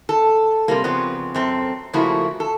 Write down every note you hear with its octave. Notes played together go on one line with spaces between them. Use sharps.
A4
C3 G3 A#3
C#3 F3 B3 C4
F#2 C4 A4
C#3 F3 A3 A#3 E4 F#4
A4